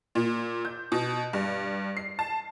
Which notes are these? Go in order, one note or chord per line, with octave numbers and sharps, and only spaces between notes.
A#2
G6
B2
G2
C7
A5